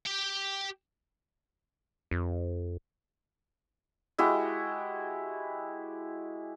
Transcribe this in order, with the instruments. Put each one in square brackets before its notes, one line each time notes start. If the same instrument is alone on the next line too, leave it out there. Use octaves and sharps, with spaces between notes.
[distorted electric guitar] G4 G5
[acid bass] F2
[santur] G#3 E4 F#4 G4